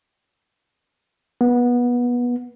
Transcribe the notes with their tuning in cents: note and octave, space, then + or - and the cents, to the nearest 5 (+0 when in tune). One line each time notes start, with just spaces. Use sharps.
B3 -20